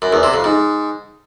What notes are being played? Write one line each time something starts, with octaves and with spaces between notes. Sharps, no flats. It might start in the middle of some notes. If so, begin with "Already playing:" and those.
F#2
E2
C3
F2
G#2